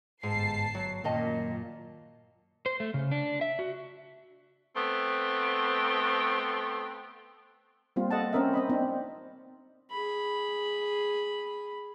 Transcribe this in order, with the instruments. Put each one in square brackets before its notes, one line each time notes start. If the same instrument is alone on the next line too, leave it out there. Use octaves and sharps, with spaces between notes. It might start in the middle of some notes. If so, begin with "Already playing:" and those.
[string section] G1 A5 C7 [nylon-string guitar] G#2
[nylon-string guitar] F#3
[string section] F#2 A#2 [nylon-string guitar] D#3 D#5 A5
[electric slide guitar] C5
A3
C#3
D4
E5
F#4
[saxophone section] A3 B3 C4
[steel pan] G3 A#3 C4 F4
A4 D#5 F#5 A5
C4 C#4 A#4 D#5 E5
C4 D#5 B5
C4 D4 D#4
[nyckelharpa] G#4 B5